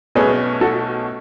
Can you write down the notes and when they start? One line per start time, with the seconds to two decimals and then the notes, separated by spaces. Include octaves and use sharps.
0.15 B1 B2 A3 C#4 G#4 B4
0.61 F#4 A4